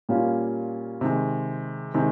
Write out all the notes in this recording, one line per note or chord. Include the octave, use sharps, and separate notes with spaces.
A#2 G3 A#3 C#4 F4
C3 D#3 G#3
C3 D#3 G#3